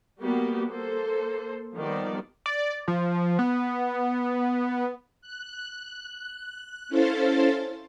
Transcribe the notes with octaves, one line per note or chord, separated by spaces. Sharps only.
G3 A#3 B3 F#4 G4
A#3 A4 C5
D#3 F3 G3 B3 D5
D5
F3
B3
F#6
C#4 E4 A4 C5 F5 A6